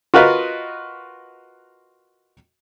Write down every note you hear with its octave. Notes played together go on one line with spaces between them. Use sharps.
F4 F#4 A#4 B4 D#5